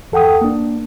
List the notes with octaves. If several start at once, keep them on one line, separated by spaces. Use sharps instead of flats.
E2 A4 F#5 G5 D#6
A#3 D4